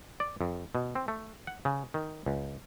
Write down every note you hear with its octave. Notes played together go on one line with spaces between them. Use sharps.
D5
F2
B2
C4
A3
F#5
C#3
D#3
C#2